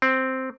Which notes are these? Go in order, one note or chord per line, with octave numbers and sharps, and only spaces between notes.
C4